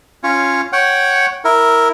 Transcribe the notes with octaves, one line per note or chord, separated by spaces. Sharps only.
C#4 F4 C#5
C#5 F#5 G5
E4 A#4